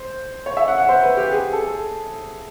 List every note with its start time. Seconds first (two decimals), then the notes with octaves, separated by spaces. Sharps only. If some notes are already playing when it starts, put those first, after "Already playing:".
Already playing: C5
0.46 C#5
0.57 E5
0.68 F#5
0.78 F#5
0.89 C5
1.03 B4
1.17 G4
1.31 G#4
1.53 A4